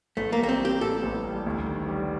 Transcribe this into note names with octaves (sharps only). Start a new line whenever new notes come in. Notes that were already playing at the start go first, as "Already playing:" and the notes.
A1 A3
A#3
G3
A#3
C4
A#3 G4
A2 A4
A1
G3
D2
D#3
G3